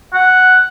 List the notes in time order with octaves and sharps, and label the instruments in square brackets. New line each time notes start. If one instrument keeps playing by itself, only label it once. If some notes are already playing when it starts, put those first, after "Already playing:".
[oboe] F#5